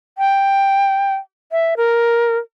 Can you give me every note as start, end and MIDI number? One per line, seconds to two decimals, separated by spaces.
0.18 1.16 79
1.52 1.74 76
1.77 2.37 70